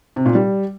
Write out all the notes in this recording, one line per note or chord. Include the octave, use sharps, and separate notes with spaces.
C3
A#2
G3